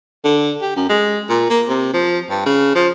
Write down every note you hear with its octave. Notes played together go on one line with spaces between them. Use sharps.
D3
G4
F#2
G#3
A#2
A#3
C3
F3
G2
C#3
F3